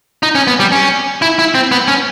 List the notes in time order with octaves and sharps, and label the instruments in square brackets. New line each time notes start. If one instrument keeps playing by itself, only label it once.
[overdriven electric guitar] D#4
C#4
B3
G3
C#4
E4
E4
C4
B3
C#4